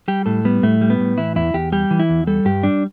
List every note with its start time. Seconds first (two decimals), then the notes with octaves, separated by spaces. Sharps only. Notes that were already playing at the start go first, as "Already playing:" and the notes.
0.08 G3 G4
0.26 A2 A4
0.45 G3 B3
0.63 A2 A3
0.81 G3
0.90 B3
1.00 A2
1.18 E3 E4
1.36 E2 E4
1.54 E2 G4
1.72 G3 G4
1.91 E3
1.99 E4
2.09 E2
2.27 G3 A4
2.45 G2 G4
2.63 G3 D4